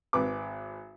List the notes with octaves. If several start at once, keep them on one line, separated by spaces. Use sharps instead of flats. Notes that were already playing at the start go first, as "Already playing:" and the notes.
G#1 B4 D6